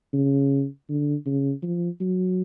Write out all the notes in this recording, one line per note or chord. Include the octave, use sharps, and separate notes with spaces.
C#3
D3
C#3
F3
F#3